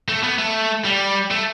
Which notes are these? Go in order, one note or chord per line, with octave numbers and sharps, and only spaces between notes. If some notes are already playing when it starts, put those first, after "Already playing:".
A3
B3
A3
G3
A3